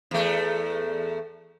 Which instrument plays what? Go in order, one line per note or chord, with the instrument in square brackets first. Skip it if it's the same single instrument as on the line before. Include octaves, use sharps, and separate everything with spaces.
[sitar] E2 A3